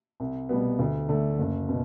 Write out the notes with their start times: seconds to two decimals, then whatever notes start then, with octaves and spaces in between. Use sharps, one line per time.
0.20 C2
0.49 B2 G3 B3
0.79 D2
1.08 D3 A3 D4
1.38 F#1
1.69 B2